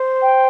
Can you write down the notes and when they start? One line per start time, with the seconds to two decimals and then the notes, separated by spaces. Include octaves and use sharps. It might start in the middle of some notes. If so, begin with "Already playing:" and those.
Already playing: C5
0.22 G5